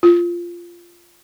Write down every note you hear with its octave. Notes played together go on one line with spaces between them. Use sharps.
F4